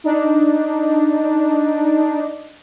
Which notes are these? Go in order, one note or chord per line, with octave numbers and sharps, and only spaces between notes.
D4 D#4